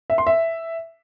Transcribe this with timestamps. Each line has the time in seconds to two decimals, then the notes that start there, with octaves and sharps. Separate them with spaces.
0.10 E5
0.18 C6
0.27 E5